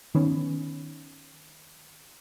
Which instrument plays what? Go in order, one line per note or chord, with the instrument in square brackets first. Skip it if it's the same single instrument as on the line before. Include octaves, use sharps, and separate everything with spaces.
[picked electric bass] D#3 B3 C#4